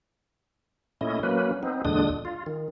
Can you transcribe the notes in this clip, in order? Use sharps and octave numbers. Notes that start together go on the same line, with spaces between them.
A#2 A3 C#4 E4 D#5
F#3 A#3 C#4 B4
B3 C4 D#4
E2 A#2 D3 G#3 D4 D#6
F4
D#3